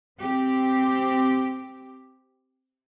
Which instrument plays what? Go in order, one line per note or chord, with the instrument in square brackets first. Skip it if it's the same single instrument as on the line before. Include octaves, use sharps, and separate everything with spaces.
[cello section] C4 G4